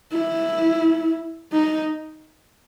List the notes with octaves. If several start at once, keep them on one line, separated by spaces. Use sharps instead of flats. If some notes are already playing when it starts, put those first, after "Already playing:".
E4
D#4